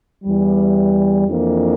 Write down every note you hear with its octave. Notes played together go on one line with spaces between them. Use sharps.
E2 E3 G3
F2 E3 A#3 D4